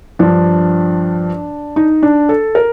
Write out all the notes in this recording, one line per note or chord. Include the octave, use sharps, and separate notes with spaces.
G2 F3 D4
D#4
D4
A4
A#4